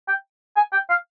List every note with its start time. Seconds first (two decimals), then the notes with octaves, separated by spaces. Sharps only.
0.08 G5
0.57 G#5
0.73 G5
0.90 F5